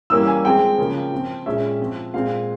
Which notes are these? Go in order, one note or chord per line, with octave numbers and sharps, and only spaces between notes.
E3 G3 A#3 C#4 E6
G#5
F3 G#3 C4 G5
C#3 F3 A#3 C#4
F3 C4
A#2 G#3 C#4 E5
F3 C4
A#2 G#3 C4 F5